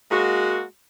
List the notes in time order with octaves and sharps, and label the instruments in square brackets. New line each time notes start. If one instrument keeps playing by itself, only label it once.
[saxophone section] G#3 A#3 F#4